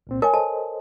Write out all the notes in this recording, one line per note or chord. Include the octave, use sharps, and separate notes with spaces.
C2 A#2 C4
A#4 C#5 G#5 A5
A4 C5 D#5 A5